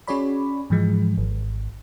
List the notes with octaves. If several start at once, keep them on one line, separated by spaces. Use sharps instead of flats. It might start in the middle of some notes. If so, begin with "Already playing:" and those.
C#4 F#4 G#4 C#5 D5 B5
G#2 E3 F3 G#3
G#1